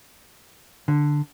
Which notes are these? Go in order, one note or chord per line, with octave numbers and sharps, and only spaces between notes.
D3